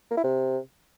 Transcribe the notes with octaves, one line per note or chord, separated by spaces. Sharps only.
A#3
E4
C3